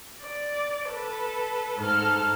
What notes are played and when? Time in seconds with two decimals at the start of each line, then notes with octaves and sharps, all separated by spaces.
0.22 D5
0.88 A4 B4
1.78 G#2 A4 F6